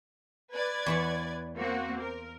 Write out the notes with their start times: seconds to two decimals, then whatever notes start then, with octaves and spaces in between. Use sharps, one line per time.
0.53 B4 D5 G#6
0.86 E2 E4 C#5
1.56 A#3 C4 F#4
2.01 A#4